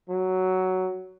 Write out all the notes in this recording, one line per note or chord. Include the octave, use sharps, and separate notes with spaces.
F#3